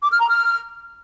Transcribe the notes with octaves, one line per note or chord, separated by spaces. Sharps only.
D6
F6
A#5
F6